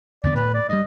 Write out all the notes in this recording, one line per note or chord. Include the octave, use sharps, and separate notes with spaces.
E2 D3 B3 D5
A2 B4
D5
G2 G3 D#5